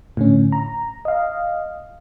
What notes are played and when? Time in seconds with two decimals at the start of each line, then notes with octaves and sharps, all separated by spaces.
0.17 A2 D3 C#4
0.52 A#5
1.05 D#5 F5